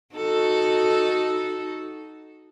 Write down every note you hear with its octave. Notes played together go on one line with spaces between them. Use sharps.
D#4 F#4 A4